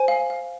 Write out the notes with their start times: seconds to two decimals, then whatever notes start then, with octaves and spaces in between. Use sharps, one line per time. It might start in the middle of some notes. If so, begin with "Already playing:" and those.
Already playing: C5 G#5
0.08 F5
0.30 F5